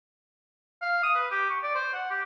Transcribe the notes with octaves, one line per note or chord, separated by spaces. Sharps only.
F5
D#6
B4
G4
C#6
D5
C5
F#5
G4